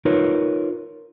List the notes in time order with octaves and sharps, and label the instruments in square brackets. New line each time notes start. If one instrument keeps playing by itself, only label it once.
[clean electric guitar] D#4 F4 A#4 B4 C#5